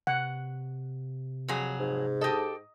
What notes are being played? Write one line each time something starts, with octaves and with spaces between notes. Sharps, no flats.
C3 F#5
F2 F#3 G#4
G#2
G4 A4 D#5